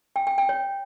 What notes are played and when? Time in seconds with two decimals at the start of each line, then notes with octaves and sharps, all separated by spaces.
0.16 G5
0.27 G5
0.38 G5
0.49 C#5